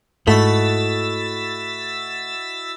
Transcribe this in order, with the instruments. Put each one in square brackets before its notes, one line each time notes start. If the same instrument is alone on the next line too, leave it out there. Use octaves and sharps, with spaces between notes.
[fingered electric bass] G#2 [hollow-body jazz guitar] A3 [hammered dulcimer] E4 F#4 D#5 [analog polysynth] E6 A6 B6